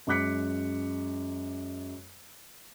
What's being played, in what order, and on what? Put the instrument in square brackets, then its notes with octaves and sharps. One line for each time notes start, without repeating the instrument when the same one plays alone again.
[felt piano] F#2 G#3 D6 F#6 B6 C#7